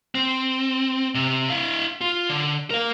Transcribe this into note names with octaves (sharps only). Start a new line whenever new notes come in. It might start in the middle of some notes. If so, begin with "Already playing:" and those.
C4
C3
E4 F5
F4
D3
A#4 F5